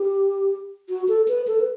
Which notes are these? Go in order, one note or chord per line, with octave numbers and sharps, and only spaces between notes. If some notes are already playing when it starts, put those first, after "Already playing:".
Already playing: G4
F#4
A4
B4
A4
B4